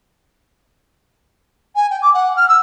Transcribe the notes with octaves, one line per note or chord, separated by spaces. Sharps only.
G#5
G5
D6
F#5
F6
E6